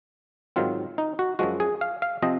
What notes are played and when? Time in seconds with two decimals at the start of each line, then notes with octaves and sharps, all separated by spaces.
0.56 G#2 D#3 F#3 C4 F4
0.98 D#4
1.19 F#4
1.39 F#2 F3 G#3 F#4
1.60 G#4
1.81 F5
2.02 F5
2.22 C3 F3 C4 D#5